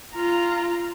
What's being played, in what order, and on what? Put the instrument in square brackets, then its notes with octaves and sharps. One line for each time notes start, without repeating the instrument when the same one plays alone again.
[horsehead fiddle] F4 A#5